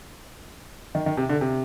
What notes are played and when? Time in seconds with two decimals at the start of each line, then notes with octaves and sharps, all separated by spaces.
0.95 D#3
1.06 D#3
1.17 C3
1.29 D3
1.41 C3